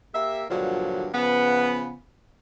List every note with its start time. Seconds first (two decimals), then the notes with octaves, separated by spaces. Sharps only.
0.15 A#3 G4 E5
0.51 G2 A#2 D3 F3 F#3
1.15 C#3 F3 B3